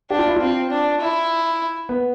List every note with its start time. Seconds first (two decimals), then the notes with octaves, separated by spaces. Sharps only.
0.10 D4 G4
0.19 F4
0.28 E4
0.36 C4 F4
0.70 D4
1.01 E4
1.89 B3